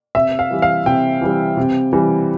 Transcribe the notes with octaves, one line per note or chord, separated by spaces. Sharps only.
C3 E5
F5
E3 G3
F5
C3 G5
E3 G3
C3
E3 G3